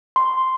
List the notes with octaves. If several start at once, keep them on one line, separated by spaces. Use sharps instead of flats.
C6